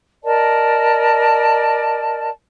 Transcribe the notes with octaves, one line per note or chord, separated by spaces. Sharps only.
A#4 D5 D#5 A5